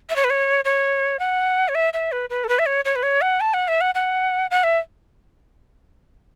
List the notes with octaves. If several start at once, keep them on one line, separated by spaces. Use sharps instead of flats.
E5
C#5
B4
C#5
C#5
F#5
C#5
E5
E5
B4
B4
A4
B4
E5
C#5
C#5
B4
C#5
F#5
A5
F#5
E5
F#5
F#5
F#5
E5